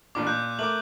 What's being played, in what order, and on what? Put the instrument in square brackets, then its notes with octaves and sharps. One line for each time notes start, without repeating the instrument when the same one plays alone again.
[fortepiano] A1 A#2 D4 [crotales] D6
[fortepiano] A#2 [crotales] F#6 G6
[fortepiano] A3 A#4 D6 [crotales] F#7